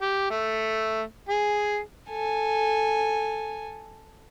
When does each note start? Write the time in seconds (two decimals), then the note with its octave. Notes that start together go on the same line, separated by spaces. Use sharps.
0.01 G4
0.30 A3
1.29 G#4
2.10 A4 G#5